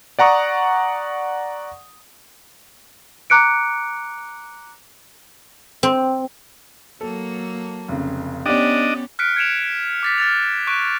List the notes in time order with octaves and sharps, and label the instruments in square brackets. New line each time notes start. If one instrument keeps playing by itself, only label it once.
[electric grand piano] D5 F#5 A#5 C#6 D#6
[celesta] A#5 D6 F#6 C#7 D7
[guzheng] C4
[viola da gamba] F#3 A#3 [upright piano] A4
[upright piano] F1 C#3
[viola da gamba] B3 C#4 [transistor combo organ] D4 D#5 [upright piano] G4 D5
[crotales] F6 F#6 B6 C#7 D7
G#6 C#7 D7 E7 F7
D6 A6 B6
F6 A6 F7
C#6 F#6 D7